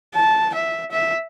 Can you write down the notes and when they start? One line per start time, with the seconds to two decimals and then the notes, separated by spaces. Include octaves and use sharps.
0.14 A5
0.54 E5
0.91 E5